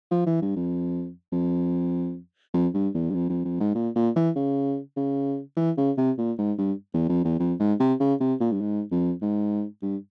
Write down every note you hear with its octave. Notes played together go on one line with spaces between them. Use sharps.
F3
E3
G2
F2
F2
F2
G2
E2
G2
F2
F2
F2
G#2
A#2
A#2
E3
C#3
C#3
E3
C#3
C3
A#2
G#2
G2
E2
F2
E2
F2
G#2
C3
C#3
C3
A#2
G2
G#2
F2
G#2
G2